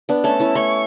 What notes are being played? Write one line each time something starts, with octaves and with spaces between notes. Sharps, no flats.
B3 D4
A3 C#4 A5
C#4 E4
A3 C#4 C#6